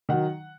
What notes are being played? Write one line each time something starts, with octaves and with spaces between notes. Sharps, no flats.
D#3 F#3 F#5